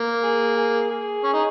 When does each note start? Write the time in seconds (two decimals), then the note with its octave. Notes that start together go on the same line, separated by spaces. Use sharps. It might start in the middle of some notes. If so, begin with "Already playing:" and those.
Already playing: A#3
0.23 G#4
0.56 G#4
0.90 G#4
1.24 C#4
1.33 D#4